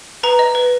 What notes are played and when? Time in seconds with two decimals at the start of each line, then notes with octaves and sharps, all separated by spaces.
0.23 B4 A#5
0.39 D#5
0.55 B4